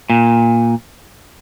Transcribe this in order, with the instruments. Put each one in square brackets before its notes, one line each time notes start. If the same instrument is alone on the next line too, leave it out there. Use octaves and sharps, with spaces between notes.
[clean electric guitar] A#2